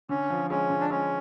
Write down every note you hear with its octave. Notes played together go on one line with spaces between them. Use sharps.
D3 C#4
F3
G#3 C#4
D3
D4
G#3 C#4